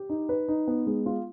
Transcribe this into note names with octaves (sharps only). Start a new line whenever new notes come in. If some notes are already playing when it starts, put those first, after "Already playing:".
Already playing: G4
D#4
B4
D#4
B3
G#3
F4